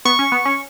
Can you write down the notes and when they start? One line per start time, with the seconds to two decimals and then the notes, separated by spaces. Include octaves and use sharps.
0.05 B3 C#6
0.19 C#4
0.32 B3
0.45 C#4